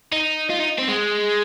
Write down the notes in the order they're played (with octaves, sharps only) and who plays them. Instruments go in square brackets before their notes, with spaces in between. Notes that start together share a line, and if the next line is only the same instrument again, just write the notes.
[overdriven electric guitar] D#4
F4
D#4
C4
G#3